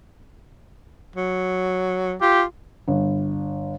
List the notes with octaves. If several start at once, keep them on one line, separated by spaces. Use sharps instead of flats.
F#3
F4 G4
G1